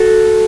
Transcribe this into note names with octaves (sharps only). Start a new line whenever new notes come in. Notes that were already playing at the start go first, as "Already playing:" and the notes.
Already playing: F#4 A4